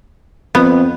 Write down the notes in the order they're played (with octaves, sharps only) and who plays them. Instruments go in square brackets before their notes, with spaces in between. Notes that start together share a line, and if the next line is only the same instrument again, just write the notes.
[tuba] F2 [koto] B3